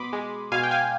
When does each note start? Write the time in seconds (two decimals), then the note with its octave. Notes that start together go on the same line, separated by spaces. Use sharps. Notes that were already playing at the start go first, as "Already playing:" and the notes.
Already playing: B2 B5 C6 D6 D#6
0.13 G#3
0.52 B2 F5 G#5
0.63 G5
0.71 F5 G#5